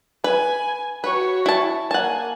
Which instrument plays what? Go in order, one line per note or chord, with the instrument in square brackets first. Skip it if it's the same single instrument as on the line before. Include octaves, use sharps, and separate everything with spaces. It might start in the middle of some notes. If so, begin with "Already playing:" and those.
[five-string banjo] B4 [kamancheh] G#5
[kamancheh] F#4 C#5 [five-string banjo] B4
[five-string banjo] E4 A5
[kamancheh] A#3 G#5 [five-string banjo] F#5 A5